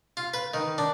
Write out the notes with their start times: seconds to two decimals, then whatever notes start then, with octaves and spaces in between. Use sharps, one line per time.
0.17 F4
0.34 B4
0.54 D#3
0.78 D4